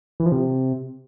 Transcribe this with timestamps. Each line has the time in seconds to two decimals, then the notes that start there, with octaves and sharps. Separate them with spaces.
0.20 E3
0.26 F3
0.32 C3